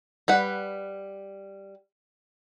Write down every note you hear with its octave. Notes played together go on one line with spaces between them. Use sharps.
G3 B4 F#5